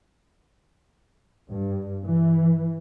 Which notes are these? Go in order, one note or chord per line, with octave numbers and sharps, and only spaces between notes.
G2
E3